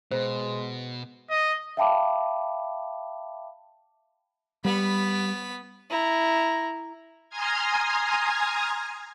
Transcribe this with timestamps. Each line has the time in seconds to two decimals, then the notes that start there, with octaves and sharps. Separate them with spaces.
0.11 B2 G#3 C5
1.30 D#5
1.77 E5 F5 G5 A5 B5 D6
4.65 G3 B3 B5
5.90 E4 A#5
7.29 G#5 A#5 C6 D#6 F6 G#6